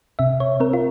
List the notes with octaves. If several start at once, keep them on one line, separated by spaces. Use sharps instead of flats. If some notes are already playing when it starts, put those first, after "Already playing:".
C3 E5
C#5
C4 A#4
F4